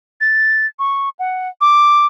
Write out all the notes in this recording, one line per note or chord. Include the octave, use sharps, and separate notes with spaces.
A6
C#6
F#5
D6